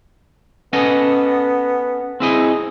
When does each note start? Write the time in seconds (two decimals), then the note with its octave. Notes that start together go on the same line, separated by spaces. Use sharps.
0.73 B3 C#4 A4 D#5
2.20 C4 E4 G#4 D#5